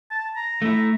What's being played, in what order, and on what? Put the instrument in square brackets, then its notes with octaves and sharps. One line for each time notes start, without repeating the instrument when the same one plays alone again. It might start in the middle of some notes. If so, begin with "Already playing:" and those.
[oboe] A5
A#5
[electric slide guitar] A3 E4